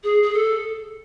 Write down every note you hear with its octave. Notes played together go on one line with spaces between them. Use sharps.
G#4
G#4
A4